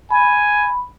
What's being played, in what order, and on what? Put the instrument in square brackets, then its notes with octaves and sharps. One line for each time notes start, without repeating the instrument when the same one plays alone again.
[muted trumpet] G#5 [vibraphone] B5